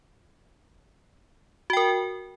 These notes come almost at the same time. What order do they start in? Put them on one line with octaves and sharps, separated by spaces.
F#4 G5 A#4